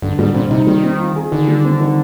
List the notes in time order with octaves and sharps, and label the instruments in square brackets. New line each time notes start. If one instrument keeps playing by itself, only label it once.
[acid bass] G2 [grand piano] D3
[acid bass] G#2 [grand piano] G3
[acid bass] A#2 [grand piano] C4
[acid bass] C3 [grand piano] D#4
[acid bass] D#3 [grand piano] G3
[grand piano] C4
F4
G#4
[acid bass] D3 [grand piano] D#3
[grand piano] G3
C4
D#3